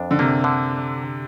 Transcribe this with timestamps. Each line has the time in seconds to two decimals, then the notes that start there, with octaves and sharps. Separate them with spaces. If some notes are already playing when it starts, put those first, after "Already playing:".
Already playing: F2 D4
0.11 D3
0.19 C3 A#3
0.44 D3